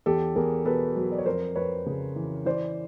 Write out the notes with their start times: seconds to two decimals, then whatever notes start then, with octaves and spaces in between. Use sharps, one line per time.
0.06 E2 G4 A4
0.36 E2 G#4 A#4
0.65 B2 A4 B4
0.96 F#3
1.12 D5
1.18 C#5
1.26 F2 A#4 C5
1.56 F2 B4 C#5
1.86 C#3
2.16 E3
2.46 E3 C5 D5